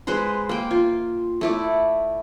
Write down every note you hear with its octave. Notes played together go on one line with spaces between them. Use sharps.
G#3 B4 C5 C6
A#3 G5
F4
A3 E4 D5